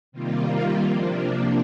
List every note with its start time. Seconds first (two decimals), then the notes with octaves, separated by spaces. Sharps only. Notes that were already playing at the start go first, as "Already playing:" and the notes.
0.12 C3 D#3 G3 A#3 F4
0.84 C3 F3 A#3 D4